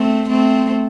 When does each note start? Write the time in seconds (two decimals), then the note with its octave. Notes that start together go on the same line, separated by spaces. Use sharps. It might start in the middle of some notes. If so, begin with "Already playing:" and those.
Already playing: A3 C4
0.30 A3 C4